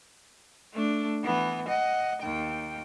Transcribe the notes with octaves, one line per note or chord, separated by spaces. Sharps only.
A3 D4
E3 B3
D#5 F#5
D#2 G5